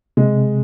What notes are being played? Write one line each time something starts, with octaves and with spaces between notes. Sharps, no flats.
C3 G#3